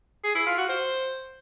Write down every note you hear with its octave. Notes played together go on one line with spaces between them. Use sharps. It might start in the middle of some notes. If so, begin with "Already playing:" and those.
G#4
E4
F4
F#4
C5